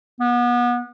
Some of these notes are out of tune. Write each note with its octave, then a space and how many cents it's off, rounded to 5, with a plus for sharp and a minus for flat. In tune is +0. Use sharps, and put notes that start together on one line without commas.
B3 -30